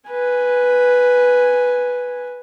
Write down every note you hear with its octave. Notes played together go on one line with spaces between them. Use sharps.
B4 G#5